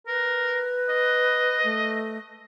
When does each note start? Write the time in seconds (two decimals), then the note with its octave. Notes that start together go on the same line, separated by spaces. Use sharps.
0.07 A#4 B4
0.89 D#5
1.64 A3